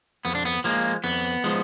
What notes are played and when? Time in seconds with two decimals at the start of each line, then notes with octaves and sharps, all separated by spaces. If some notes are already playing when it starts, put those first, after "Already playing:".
0.25 F2 B3
0.35 D4
0.45 B3
0.64 F3 G#3 A#3
1.04 F2 B3
1.44 F3 G#3